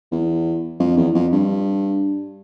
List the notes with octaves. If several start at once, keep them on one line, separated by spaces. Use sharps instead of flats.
E2
F2
E2
F2
G2